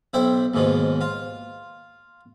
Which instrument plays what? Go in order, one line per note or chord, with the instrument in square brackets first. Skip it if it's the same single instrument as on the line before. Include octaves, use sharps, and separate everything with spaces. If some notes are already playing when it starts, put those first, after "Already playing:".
[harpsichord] B1 E4 C5 G5
D#2 G#2 B2 F3
F4